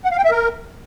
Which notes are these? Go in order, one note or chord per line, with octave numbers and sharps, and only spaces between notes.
F#5
F5
G5
E5
A#4